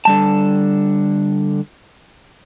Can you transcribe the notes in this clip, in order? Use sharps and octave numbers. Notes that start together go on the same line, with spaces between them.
D3 G3 A5